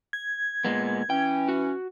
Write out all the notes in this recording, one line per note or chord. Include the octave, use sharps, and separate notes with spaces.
G#6
A#2 G#3 B3
E3 C#4 G5
F#4